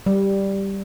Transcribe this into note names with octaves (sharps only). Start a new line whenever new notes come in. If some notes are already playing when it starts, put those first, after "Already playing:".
G3